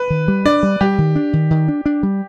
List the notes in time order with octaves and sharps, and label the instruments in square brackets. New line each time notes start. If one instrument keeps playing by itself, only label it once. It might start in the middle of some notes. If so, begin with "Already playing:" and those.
Already playing: [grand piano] B4
[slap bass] D#3
G3
[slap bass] D4 [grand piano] D5
[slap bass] G3
[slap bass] G3 [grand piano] G4
[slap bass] D#3
D4
D#3
D#3
D4
D4
G3